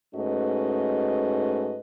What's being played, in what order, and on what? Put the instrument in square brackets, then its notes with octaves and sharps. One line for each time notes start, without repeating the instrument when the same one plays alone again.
[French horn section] G#2 A3 C#4 F#4 B4 D#5